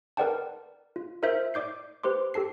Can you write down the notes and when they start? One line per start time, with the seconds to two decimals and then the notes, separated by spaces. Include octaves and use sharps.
0.17 A#4 B4 D5 F#5 G5 A5
0.96 F4
1.22 F4 A#4 C5 E5 G6
1.54 D5 D6 G6 C7
2.04 G4 B4 C5 C6 D6
2.34 G4 A4 A5 C7